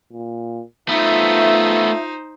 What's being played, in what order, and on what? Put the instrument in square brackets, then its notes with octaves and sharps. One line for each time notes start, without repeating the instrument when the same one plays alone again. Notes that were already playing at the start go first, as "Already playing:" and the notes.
[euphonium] A#2
[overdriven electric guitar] A3 B3 [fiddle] D#4 C5 [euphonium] F4 [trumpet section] E5